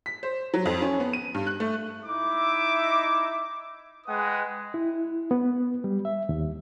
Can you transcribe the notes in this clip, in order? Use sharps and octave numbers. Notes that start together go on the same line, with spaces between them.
B6
C5
F#3
F2
C#4
B3
D#7
G2
F#6
A3
D#4 E4 E5 D6
G#3 B4 F#5 G5 D#6
E4
B3
G3
E5
D#2